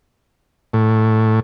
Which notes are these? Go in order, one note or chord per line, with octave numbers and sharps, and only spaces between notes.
A2